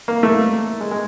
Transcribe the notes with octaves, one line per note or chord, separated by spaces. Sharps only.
A#3
A3
G#3
G#3